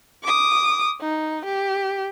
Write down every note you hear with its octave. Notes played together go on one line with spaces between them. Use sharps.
D6 D#6
D#4
G4